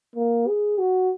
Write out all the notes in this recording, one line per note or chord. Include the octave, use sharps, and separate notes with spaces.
A#3
G#4
F#4